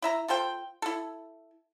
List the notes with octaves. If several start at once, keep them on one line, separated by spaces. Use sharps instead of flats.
E4 E5 A#5
F4 A4 C5 G5
E4 A4